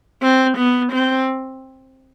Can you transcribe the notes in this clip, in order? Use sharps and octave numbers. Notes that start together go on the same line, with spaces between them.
C4
B3
C4